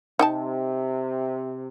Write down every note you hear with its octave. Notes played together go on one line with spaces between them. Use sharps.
C3 D#4 G5 A5